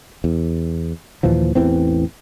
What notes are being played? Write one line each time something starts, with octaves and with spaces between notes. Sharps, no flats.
E2
D#2 A#2 E3 F3
A1 E2 E3 C4